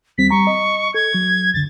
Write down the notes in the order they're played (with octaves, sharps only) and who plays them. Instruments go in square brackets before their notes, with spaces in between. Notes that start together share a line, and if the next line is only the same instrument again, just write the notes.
[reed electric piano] D#2 G3 C4 [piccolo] B6
[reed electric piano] G3 A#5 [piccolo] C#6
[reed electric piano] D#5
[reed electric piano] A4 [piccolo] G#6
[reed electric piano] F#3
[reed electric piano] C#2 F#2 D3 [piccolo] A6